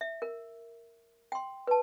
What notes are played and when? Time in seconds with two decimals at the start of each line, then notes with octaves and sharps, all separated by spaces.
0.01 E5
0.22 A#4
1.32 G5 C6
1.67 B4 A5